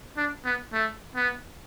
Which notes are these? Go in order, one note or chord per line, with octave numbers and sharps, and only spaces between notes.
D4
B3
A3
B3